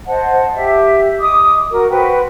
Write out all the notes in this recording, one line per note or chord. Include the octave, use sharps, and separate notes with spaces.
C5 D#5 F#5 A5
G4 E5
D#5 D6 D#6
F#4 A#4
F#4 B4 C5 G5